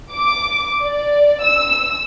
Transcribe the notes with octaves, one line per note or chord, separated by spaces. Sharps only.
D6
D5
E6